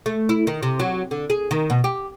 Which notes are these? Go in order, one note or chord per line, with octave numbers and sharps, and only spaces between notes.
A3
E4
D#3
C3
F#3
D3
G#4
D#3
B2
G4